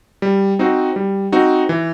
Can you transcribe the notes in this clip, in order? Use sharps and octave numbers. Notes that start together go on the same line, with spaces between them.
G3
C4 D#4 F#4
G3
C4 D#4 F#4
E3